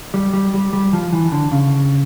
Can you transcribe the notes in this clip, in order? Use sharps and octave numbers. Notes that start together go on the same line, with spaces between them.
G3
G3
G3
G3
F3
E3
D3
C#3